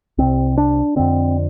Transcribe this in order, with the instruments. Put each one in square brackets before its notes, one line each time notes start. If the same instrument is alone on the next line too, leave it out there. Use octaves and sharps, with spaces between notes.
[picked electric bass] C2 C3 C4
D4
F2 D3 C4